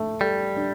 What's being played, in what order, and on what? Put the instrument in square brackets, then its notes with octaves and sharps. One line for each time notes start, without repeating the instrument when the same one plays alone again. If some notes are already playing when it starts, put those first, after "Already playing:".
Already playing: [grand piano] A3
[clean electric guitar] G3 [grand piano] A4
[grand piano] D4